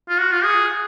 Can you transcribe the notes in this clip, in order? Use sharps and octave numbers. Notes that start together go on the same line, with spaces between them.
F4
F#4
F4
G#4